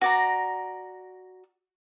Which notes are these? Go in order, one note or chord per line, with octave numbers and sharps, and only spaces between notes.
F#4 D5 A#5